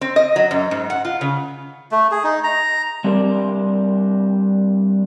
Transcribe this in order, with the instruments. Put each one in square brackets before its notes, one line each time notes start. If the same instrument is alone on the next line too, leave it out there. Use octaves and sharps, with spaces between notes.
[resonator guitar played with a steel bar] C4
D#5
F#3
F#2
G#2
F#5
F4
C#3
[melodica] A3
G#4
D#4
A#5
[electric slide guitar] G3 C4 D4 G4 A#4 D5